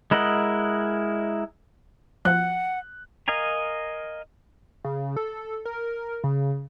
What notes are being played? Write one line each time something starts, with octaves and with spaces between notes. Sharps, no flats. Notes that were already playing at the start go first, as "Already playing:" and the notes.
G#3 E4 A#4 D#5 F#5
F3 F#5 F#6
A#4 D#5 F5 G#5 A#5
C#3
A4
A#4
C#3